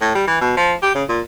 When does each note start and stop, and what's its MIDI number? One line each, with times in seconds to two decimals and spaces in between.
0.02 0.11 45
0.15 0.24 55
0.27 0.37 52
0.41 0.54 47
0.57 0.73 53
0.83 0.93 67
0.95 1.04 49
1.09 1.21 46